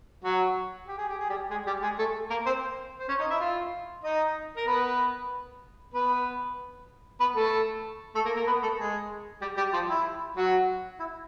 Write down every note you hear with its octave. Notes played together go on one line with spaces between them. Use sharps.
F#3 F#4
G4
G#4
G4
G#4
G3 G4
G#3 G#4
G3 G4
G#3 G#4
A3 A4
A#3 A#4
C4 C5
C5
C#4 C#5
D#4 D#5
E4 E5
F4 F5
D#4 D#5
A#4
B3 B4
B3 B4
B3 B4
A3 A4
A3 A4
A#3 A#4
A#3 A#4
B3 B4
A3 A4
G#3 G#4
G3 G4
G3 G4
F3 F4
E4
F#3 F#4
E4